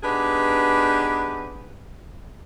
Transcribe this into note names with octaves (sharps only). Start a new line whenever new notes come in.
B3 D4 D#4 G4 G#4 B4